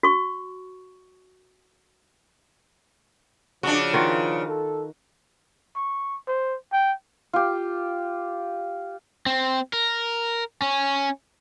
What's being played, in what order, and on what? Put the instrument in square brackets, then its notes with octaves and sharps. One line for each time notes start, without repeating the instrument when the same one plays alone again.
[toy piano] F#4 C#6
[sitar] C#3 D4 [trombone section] F3 [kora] F#4
[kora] D#3 F4 F#4
[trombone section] A4
[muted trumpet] C#6
C5
G5
[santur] F4 G4
[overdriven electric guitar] C4
A#4
C#4